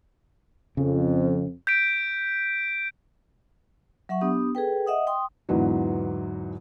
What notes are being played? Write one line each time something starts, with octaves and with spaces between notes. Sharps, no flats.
F2 C#3
G6 B6 D7
F#3 E5 F#5 C#6
B3 D4 G4 D#6
G#4 A4 B4 G5
D#5 E5 F#5 D#6
G5 C6 D#6
E2 G#2 D3 E3 F#3